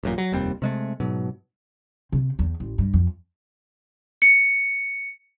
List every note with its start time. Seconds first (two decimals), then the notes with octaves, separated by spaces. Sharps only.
0.03 A1 F#2 A#2
0.18 F#3
0.32 F1 D#2 G3 C4
0.62 C3 G#3 A3
1.00 G#2 B2 F#3
2.12 C3
2.39 E2
2.60 A1
2.78 G2
2.93 F2
4.22 C#7